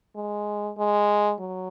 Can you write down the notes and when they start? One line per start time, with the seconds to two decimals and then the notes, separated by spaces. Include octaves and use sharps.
0.16 G#3
0.78 G#3
1.40 F#3